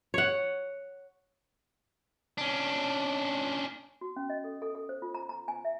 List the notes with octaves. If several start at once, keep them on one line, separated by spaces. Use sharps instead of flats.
C#5 F#5
C#4 D4
F#4
C#4
D#5
A4
A4
A4
C5
F4
A#5
A#5
G#5
E5